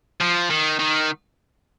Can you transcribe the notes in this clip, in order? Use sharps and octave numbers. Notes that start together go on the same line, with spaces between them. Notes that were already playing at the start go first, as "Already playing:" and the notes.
F3
D#3
D#3